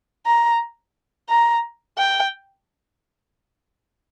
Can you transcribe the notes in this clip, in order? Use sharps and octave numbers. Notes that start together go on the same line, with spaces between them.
A#5
A#5
G5